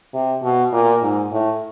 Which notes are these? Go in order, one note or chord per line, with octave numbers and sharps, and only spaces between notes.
C3
B2
A#2
G#2
A2